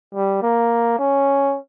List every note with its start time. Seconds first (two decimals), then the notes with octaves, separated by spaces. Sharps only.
0.15 G3
0.42 A#3
0.99 C#4